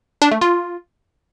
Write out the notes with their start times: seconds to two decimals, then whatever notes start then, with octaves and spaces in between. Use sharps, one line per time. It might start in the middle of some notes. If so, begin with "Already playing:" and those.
0.22 D4
0.32 A3
0.41 F4